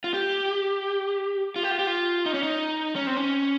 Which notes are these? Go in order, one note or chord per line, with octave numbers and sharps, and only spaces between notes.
F4
G4
F4
G4
F4
G4
F4
D#4
C#4
D#4
C#4
C4
C#4